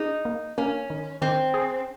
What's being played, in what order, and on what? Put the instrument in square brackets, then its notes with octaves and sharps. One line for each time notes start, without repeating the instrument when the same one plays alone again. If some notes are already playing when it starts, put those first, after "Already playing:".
Already playing: [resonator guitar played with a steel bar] D#4 [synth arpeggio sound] G#4
[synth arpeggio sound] A#3
[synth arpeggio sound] A#3 [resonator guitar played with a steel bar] C#4
[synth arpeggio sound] D#3
[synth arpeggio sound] D#3 [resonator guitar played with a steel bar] C4
[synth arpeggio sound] G#4